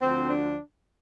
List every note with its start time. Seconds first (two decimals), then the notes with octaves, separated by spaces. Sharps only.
0.01 D2 D3 F3 C4
0.30 D4